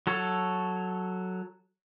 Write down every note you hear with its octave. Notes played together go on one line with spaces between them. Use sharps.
F#3 A4 C#5